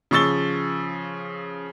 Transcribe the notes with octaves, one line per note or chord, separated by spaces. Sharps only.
C#3 F3 C#6 E6 A6 G7